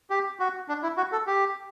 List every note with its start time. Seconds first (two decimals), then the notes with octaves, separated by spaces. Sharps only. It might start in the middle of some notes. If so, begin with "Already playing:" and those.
0.10 G4
0.40 F#4
0.69 D4
0.83 E4
0.97 F#4
1.12 A4
1.27 G4